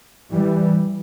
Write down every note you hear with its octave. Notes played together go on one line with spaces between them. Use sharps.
E3 G3